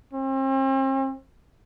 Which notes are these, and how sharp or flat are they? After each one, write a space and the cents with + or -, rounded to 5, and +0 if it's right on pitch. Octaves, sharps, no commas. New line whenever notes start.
C4 +40